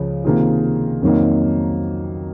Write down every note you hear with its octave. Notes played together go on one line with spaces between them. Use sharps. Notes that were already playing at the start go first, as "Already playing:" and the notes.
Already playing: C#2 C#3 F3
C3 D#3 A#3 F4 G#4
F2 D#3 F#3 A#3 D#4